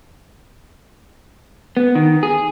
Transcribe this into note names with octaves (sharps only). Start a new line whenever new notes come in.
B3
D#3
G#4